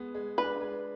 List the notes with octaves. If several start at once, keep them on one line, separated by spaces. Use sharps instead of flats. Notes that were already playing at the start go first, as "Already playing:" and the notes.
Already playing: G#3 B3
G#3
D4 B4
G#3